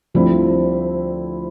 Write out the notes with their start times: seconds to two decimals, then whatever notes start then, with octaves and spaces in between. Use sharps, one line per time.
0.14 D2 D3 F3 G3 C4 E4